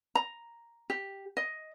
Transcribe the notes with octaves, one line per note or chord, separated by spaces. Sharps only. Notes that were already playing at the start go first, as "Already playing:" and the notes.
A#5
G4
D#5